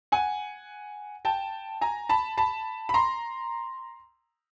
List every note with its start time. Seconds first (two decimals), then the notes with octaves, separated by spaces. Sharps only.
0.12 F#5 G#5
1.25 G5 A5
1.81 G#5 A#5
2.09 A5 B5
2.38 A5 B5
2.89 B5
2.94 A#5 C6